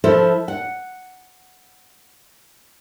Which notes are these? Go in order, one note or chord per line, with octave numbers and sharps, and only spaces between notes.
F3 E4 A4 C5 E5
F#5